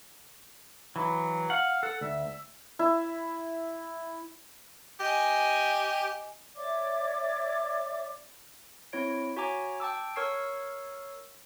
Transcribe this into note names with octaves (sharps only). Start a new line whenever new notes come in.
E3 F#3
F5 F#5
A4 F#5
D2 E5
E4
G4 D#5 G#5
C#5 D5 E5 D6
C4 E4 C#5 D7
F#4 C#5 G#5 A#5 D6
G5 A5 D6 E6
A#4 C#5 C#6 E6 C7